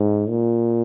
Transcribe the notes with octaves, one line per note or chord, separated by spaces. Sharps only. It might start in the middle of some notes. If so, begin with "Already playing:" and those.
Already playing: G#2
A#2